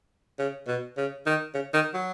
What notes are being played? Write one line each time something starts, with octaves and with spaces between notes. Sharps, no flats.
C#3
B2
C#3
D#3
C#3
D#3
F#3